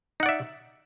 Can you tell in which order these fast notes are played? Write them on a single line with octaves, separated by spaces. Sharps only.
D#4 F#5 D5 E5